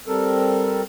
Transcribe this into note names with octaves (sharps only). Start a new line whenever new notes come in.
G3 C4 A4 A#4